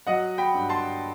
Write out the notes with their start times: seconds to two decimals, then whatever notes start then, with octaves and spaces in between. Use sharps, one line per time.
0.07 F#3 D#5 F#5
0.38 G5 B5
0.54 G2
0.69 A5 C6